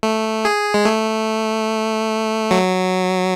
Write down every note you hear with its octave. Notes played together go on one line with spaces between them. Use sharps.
A3
G#4
G#3
A3
F#3